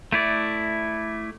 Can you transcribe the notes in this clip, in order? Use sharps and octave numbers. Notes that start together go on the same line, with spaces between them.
A3 E4 D5